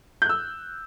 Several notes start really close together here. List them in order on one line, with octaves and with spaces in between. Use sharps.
G6 F#6 E6